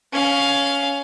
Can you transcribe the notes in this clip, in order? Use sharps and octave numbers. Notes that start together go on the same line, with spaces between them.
C#4 F5